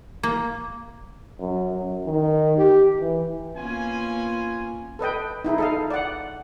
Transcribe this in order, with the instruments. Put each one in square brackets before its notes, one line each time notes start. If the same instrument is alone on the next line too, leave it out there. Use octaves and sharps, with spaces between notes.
[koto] A#3
[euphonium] F#2
F#2
D#3
G4
E3
[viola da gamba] A#3 B3 C#4 [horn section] F4 G#5
[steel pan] A4 B4 D#5 G5
D#4 E4 G#4
A4 D#5 F5
D5 F#5